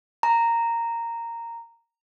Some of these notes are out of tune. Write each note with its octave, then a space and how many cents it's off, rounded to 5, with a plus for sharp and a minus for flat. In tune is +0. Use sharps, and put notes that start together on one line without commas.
A#5 -10